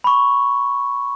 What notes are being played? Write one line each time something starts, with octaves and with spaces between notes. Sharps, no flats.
B5 C#6